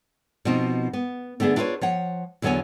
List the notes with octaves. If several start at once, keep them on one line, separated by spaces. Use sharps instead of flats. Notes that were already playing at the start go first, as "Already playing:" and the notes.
B2 F3 C4 D#4
B3
D3 A3 B3 D4 G#4
D4 E4 F4 G#4 B4 C#5
F3 C#5 F#5
E2 D3 F#3 B3 C#5 G#5